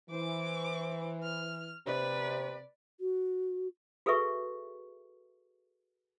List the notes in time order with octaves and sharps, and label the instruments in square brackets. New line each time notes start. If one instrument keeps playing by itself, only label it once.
[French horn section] E3 [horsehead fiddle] C5 [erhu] D6
[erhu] F6
[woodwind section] C3 [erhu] B4 [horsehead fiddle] D5
[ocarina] F#4
[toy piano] F#4 G#4 A4 B4 E5 C#6